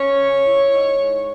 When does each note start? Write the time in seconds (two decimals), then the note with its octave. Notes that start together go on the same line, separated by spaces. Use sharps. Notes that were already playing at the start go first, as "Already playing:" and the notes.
Already playing: C#4 C#5
0.19 C#3
0.46 E4
0.73 G#2
0.98 G#2